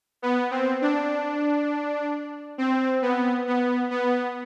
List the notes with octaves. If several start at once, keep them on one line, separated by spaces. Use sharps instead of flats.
B3
C4
D4
C4
B3
B3
B3